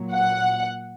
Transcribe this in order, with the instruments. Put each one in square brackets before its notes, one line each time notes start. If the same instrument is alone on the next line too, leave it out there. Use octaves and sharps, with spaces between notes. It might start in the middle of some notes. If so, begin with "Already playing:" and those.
Already playing: [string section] A#2 F#3
F#5